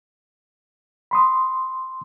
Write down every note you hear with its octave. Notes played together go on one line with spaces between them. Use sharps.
B5 C6 D#6